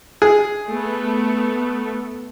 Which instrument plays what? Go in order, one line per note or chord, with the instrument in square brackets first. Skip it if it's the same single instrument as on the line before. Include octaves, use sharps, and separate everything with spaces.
[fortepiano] G#4
[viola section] A3 B3